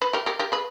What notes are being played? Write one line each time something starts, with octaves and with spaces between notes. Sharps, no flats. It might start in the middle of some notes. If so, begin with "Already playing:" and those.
B4
G4 A#4
G4 A#4
G4 A#4
G#4 B4